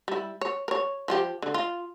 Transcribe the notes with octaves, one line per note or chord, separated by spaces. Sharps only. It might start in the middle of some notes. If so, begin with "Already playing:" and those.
G3 E4
C#5
A#4 C#5
F3 F4 G4
D3
F4